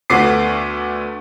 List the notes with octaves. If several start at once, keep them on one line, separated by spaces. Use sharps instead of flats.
D2 A3 B3 D6 C7